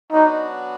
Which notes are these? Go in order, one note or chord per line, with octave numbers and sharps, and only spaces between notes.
F#3 B3 D4 D#4 F#4